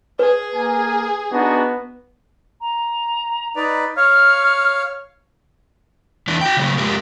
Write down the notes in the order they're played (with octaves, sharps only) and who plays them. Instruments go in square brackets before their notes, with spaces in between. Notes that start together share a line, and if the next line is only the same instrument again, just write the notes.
[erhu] G#4 [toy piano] B4
[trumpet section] A#3 G#5
[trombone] B3 [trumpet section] D4 D#4 F#4
[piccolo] A#5
[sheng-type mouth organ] D#4 B4 D5
[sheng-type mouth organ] C#5 F5 [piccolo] F6
[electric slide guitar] E2 E3 D4
F#4 G5
C#3 F#3 A3
F2 G#3 G4 A#4